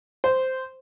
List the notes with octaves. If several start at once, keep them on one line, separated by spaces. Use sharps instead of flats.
C5